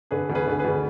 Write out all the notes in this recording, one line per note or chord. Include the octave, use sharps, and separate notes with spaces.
D3 G#4 B4
D2
G#4 B4
D3
G#4 B4
D2